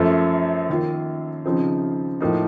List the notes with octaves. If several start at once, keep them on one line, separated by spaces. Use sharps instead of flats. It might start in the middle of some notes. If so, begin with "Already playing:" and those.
Already playing: F#2 F3 A3
D#3 A#3 F4
C#3 F3 C4 D#4
A2 F3 A#3 D#4